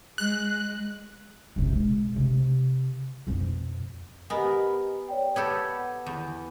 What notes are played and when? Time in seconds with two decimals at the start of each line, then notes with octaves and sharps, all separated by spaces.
0.18 G#3 F#6
1.56 F#1 C3
1.69 B2 G#3
2.16 C3
3.27 F2 B2
4.30 B3 G4 A#4 D#5 G#5
5.09 C#5 D5 G5
5.36 B3 G4 A4 G#6
5.72 F#5
6.06 E2